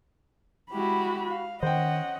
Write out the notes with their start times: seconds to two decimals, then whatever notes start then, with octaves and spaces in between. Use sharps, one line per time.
0.71 G#3 E4 F#4 G4 B5
1.30 F5
1.63 D#3 C#4 C5 D#5 F#5 G5